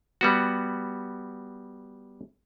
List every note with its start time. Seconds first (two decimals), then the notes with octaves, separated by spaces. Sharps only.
0.21 G3 B3 F#4